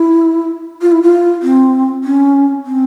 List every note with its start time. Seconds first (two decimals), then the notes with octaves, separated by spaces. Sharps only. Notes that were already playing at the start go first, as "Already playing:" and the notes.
Already playing: E4
0.82 F4
0.92 E4
1.03 F4
1.43 C4
2.04 C#4
2.66 C4